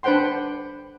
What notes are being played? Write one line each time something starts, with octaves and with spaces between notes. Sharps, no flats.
D4 B4 C5 F#5 G5 C6